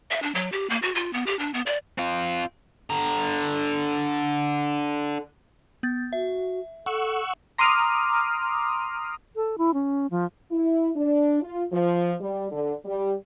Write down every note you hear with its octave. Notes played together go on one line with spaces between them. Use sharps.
E5
D4
F#3
G4
A#3
F#4
F4
B3
G4
D4
B3
D5
C4 F4
D3 A#5
B3 G6 A6
F#4 E5
A4 F#5 C#6 E6
A#5 C6 D6 D#6 F6
A4
E4
C#4
F3
E4
D4
F4
F3
G3
D3
G3